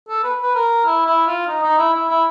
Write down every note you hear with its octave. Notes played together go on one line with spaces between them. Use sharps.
A4
B4
B4
A#4
E4
E4
F4
D#4
D#4
E4
E4
E4